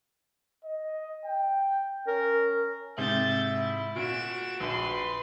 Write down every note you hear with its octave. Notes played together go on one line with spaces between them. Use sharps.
D#5
G5
C#4 A#4
G#2 C3 E5 G6 A6
E4
A#2 F#4 D7 E7
A#1 B4 C6